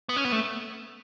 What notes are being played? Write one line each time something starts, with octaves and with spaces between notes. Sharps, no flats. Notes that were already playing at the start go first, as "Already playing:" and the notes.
B3
C#4
B3
A3